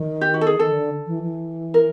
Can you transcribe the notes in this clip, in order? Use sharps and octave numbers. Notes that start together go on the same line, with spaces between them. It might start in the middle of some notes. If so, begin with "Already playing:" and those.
Already playing: D#3
G4
F#4
A4
G#4
D#3 A4
D3
E3
E3
A#4